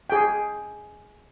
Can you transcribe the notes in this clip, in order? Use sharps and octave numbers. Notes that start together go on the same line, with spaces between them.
G#4 G5